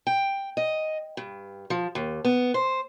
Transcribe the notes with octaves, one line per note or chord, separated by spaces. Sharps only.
G5
D#5
G2
F3
D#2
B3
C5